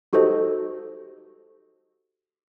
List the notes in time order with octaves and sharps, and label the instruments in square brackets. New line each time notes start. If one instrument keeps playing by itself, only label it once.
[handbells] D#4 F#4 G4 A4 C5 D#5